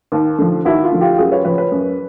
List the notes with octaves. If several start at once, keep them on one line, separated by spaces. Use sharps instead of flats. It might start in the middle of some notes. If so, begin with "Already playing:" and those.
D#2
D3 F3
D#2 E4 F#4
F4
D3 F3
F4 G4
F#2 F#4 G#4
B4 C#5
C#3 F3 B4 C#5
B4 C#5
F#2